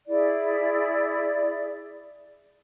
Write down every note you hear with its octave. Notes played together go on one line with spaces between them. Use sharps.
E4 G#4 D5